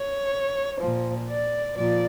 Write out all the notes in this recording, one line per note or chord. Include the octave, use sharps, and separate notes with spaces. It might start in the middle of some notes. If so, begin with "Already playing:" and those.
Already playing: C#5
A#2 F3
D5
A#2 F3 D5